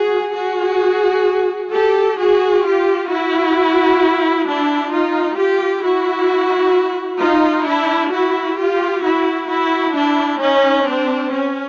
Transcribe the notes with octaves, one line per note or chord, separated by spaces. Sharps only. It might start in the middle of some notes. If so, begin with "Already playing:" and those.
Already playing: F#4 G#4
F#4 G#4
G4 A4
F#4 G#4
F4 G4
E4 F#4
D4 E4
D#4 F4
F4 G4
E4 F#4
D#4 F4
D4 E4
E4 F#4
F4 G4
E4 F#4
E4 F#4
D4 E4
C#4 D#4
C4 D4
C#4